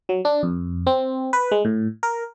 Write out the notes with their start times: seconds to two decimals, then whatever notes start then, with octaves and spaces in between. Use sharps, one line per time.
0.09 F#3
0.25 D4
0.43 F2
0.87 C4
1.33 B4
1.52 G#3
1.65 A2
2.03 A#4